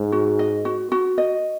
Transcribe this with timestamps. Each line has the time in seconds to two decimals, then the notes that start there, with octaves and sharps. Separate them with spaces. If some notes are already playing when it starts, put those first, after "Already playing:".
Already playing: G#2
0.12 F#4
0.39 D#5
0.65 F#4
0.92 F#4
1.18 D#5